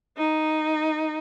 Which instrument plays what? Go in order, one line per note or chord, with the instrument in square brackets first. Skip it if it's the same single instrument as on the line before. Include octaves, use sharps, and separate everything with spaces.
[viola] D#4